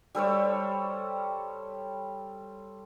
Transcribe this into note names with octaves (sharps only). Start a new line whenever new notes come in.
G3 A4 C5 C#5